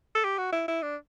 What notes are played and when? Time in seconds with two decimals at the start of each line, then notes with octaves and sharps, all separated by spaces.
0.15 A4
0.24 G4
0.38 F#4
0.52 E4
0.68 E4
0.82 D4